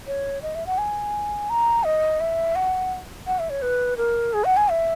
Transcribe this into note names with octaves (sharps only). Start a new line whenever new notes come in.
C#5
D#5
E5
F#5
G#5
A#5
D#5
E5
F#5
F#5
E5
C#5
B4
A#4
G#4
F#5
G#5
E5